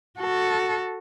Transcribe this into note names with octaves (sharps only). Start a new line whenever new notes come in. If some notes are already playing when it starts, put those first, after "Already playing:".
F#4 A4